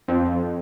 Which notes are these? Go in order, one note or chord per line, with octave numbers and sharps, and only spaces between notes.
F2